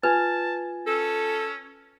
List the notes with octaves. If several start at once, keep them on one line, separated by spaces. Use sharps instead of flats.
F4 B4 G#5 A5 G#6
C#4 A4